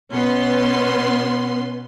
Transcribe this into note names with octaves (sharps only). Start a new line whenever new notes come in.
B2 B3 C#4 B4 C6